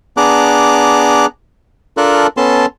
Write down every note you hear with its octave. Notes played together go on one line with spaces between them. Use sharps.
B3 D4 G#4 A#5 D6 F#6
D4 F4 A4 A#4 F#6
B3 C#4 A4 A5 C6